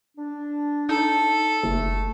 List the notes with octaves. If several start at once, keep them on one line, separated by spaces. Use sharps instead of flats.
D4
D#4 A4
F#1 A3